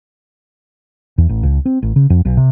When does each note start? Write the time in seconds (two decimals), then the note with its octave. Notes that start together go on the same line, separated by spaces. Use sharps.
1.18 E2
1.29 A1
1.43 C#2
1.66 C4
1.82 A1
1.96 C#3
2.10 F2
2.25 B1
2.37 C3